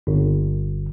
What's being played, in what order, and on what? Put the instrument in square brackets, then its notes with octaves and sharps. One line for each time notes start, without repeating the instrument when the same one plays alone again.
[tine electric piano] G1